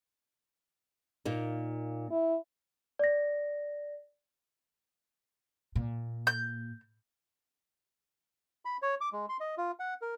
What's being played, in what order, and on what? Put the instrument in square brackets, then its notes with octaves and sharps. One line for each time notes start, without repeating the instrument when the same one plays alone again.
[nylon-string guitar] A#2 A#3 D#4
[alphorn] E4
[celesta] D5 A#6
[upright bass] A#2
[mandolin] G6
[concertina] B5
C#5
D6
G#3
C6
D#5
F4
F#5
A#4